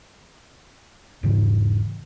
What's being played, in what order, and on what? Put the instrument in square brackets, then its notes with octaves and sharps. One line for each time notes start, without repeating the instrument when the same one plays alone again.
[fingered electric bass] E1 G#2 C#3 E3